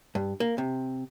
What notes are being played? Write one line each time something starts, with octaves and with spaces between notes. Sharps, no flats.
G2
A#3
C3